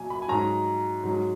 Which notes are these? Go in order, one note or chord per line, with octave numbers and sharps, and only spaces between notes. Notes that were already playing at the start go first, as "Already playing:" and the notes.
Already playing: A#2 F#3 G#5
B5
G#5
G#2 F#3 A#5
G#2 F#3